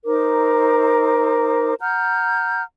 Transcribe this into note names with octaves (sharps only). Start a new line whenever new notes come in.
D#4 A#4 C5 D6
F#5 A#5 F6 G6